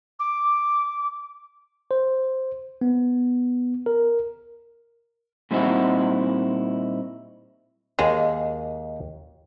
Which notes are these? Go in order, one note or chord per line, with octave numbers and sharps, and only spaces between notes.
D6
C5
B3
A#4
A#2 G3 C4 D#4 E4 F#4
D#2 G#3 F5 G#5